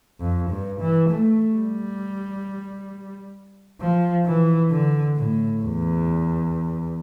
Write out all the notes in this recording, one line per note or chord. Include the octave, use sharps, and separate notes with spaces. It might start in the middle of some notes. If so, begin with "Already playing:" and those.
F2
G2
E3
A3
G3
F3
E3
D3
A2
E2